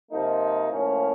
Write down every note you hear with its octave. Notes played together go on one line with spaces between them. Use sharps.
C3 F3 A#3 D#4
A2 F3 A#3 C#4